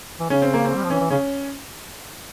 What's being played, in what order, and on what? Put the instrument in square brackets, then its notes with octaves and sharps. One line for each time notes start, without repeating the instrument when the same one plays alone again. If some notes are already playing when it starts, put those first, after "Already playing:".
[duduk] E3
[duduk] C#3 [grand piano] C#4
[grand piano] C4
A#3
C4
[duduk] G3
F3
[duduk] E3 [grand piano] C#4
[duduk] E3
[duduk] C#3 [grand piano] C#4